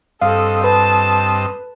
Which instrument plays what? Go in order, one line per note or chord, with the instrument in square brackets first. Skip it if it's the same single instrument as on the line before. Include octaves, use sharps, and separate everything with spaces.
[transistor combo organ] G2 C4 D#5 [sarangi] A4 [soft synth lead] F5
[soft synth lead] B4 [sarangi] A5